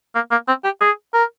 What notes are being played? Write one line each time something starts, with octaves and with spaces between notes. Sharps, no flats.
A#3
A#3
C4
G4
G#4
A#4